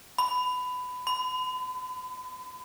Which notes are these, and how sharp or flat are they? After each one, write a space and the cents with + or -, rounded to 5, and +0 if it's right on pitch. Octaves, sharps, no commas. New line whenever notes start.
B5 +20
B5 +45